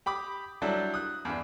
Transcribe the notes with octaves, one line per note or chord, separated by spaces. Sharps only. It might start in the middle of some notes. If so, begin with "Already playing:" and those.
G4 B5 D6 D#6
F#3 G3 D4 E4 A4
D#6 F#6
E2 G2 D4